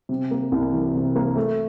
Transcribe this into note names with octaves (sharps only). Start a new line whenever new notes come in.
C3
A#3
C2
E3
C3
A#3
A3